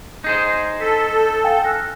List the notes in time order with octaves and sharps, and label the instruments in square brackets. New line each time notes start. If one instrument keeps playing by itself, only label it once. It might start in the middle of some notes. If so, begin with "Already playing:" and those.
[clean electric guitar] D#4 G#4 C5
[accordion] A4 [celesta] B6
[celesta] F5 G5 G#5
F6 F#6 A#6